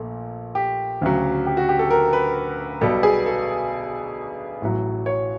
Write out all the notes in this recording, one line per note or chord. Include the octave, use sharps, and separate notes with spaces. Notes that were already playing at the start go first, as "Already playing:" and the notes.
Already playing: A#1 A#2 A3
G4
D2 C#3 F#3
G4
F#4
G4
A4
A#4
B4
B1 B2 G3 B3 A4
G#4
A4
A1 A2 F#3
C#5